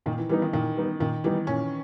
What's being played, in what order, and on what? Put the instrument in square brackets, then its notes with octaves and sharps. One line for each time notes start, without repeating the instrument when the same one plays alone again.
[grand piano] A#2 [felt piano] D#3
[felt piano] E3
[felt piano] E3 [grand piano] G3 B3 D#4
[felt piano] D#3
[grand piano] A#2 [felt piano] D#3
[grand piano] G3 B3 D#4
[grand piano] A#2 [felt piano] D#3
[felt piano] E3 [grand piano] G3 B3 D#4
[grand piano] A#2 [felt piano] C#4